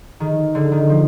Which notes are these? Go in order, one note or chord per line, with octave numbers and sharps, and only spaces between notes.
D#3
D3
D#3
F3